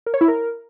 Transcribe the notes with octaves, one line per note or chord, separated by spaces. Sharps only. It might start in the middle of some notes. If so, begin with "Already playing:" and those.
A#4
C#5
E4
A#4